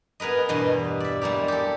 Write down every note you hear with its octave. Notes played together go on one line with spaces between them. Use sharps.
B3 G#4 A#4 B4 D#5
E2 G2 B2 D#5 C6
D5 E5
G3 G#3 A#3 G4
G4 A4